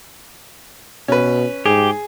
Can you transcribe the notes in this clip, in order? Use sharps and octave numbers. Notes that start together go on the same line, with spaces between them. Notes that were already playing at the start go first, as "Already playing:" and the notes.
B2 C#4 B4
G#2 G4 G#4